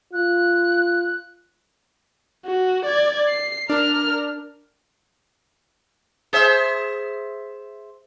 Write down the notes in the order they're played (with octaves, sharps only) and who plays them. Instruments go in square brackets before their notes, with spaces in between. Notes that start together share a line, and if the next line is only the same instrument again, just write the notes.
[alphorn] F4 [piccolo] F#6
[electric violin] F#4
D5 G#6
C7
[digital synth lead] D4 [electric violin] A#4 F6
[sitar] G#4 C5 E5